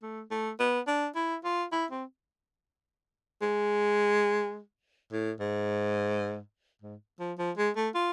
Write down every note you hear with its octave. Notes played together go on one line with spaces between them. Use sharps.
A3
A3
B3
D4
E4
F4
E4
C4
G#3
A2
G#2
G#2
F3
F3
G#3
A3
F4